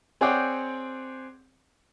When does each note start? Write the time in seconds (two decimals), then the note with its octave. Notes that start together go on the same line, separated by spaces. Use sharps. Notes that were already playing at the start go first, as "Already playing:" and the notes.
0.21 C4 G#4 C#5 D5 F#5 G5